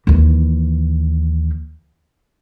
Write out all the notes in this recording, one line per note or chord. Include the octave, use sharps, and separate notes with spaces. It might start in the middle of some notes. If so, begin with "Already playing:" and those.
D#2 E3